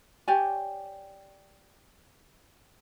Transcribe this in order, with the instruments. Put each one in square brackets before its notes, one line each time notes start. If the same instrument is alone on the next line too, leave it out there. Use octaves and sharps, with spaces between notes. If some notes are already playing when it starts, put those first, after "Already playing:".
[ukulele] G4 C#5 D5 G#5